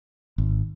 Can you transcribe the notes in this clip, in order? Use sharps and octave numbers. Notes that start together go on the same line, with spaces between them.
G#1